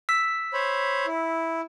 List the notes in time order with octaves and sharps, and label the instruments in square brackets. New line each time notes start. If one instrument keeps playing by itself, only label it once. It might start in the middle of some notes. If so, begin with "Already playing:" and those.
[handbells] E6 B6
[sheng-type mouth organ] C5 C#5 B5
E4